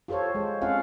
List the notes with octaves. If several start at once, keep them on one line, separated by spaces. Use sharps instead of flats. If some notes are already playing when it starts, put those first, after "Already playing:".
F4 G4 A4 C5 C#5
G#3
C4 C#4 F4 F5 F#5